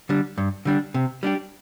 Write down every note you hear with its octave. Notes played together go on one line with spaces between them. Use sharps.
D3 G3 D4
G2
D3 G3 D4
C3
G3 D4 G4